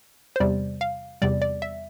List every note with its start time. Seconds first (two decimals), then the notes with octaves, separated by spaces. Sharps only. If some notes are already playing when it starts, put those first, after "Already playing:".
0.36 C5
0.40 E2 C3 G3 D5
0.81 F5
1.22 E2 C3 G3 D5
1.42 D5
1.62 E5